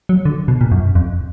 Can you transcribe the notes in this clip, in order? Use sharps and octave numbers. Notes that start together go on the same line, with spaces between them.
F#3
D3
B2
A#2
F#2
F2